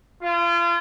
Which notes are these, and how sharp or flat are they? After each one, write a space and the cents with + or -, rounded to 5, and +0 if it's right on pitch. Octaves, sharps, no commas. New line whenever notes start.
F4 -35